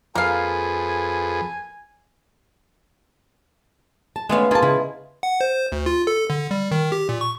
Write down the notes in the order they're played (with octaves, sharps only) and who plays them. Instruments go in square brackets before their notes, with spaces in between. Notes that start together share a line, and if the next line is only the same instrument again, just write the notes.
[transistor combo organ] F2 [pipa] A#3 F5 [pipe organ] G#4 A4 B4 [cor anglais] G#5
[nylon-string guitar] A5
[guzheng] G#3 B3 F5 [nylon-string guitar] A3 C#4
[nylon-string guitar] A#3 A5 [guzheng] F4 G#4
[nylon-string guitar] C#3 [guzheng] E4
[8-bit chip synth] F#5
C5
D2
F4
A4
D3
G3
D#3
G4
A#2
C#6